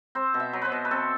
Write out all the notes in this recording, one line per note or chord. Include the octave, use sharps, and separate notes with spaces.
C4 C5
B2
E5
F#3
B4 C5
B2
B4
C4 A4